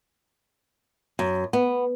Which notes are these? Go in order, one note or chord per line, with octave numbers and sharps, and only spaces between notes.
F#2
B3